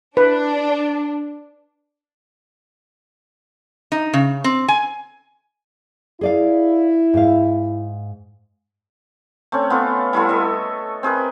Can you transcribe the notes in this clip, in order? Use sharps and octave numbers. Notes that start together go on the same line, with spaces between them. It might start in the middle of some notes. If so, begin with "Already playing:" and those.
D4 B4
D#4
C#3
C4
G#5
E4 G#4 D5 F5
G#2 F5
A3 C4 C#4
B3 F4 A4
G3 E4 F4 A4
A4 D#5 E5
C4 G#4 A#4 B4